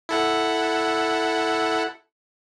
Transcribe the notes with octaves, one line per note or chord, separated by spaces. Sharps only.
E4 A4 F#5